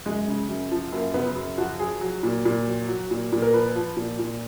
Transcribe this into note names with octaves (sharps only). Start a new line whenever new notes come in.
F#2 G#3
C#3
F#2
F3
F#2 A#3
C#3 B3
F#2
F3 F#4
F#3 G#4
F#3
A#2
A#2
F#3
F#3
A#2
A#2
A#4
F3 B4
F3
A#2
A#2